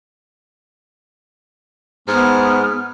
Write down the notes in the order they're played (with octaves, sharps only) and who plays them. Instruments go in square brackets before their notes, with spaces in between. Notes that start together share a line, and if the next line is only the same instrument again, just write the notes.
[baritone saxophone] G#2 [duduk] B3 [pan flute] F6